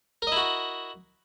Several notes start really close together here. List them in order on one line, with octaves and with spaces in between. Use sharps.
A#4 D#5 E4 F#4